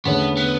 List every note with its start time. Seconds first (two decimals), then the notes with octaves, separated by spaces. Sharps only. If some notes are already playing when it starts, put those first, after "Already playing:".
0.05 E2 D3 A3 B3 C#4
0.37 B3